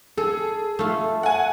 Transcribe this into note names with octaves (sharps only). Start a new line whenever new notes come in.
G#4 A4
A3 F4
F#5 G#5